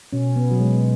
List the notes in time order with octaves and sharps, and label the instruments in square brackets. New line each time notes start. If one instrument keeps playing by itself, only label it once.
[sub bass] B2 [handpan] C#4
[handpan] B3
F#3
G#3